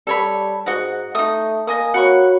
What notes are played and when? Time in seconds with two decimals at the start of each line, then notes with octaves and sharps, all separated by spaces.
0.07 G3 A4 C#5 B5
0.66 G#2 F#4 D#5 F#5
1.15 A3 D#4 D#6
1.67 A#3 D#5 G#5 D#6
1.94 F#4 C#5 F#5 B5 C#6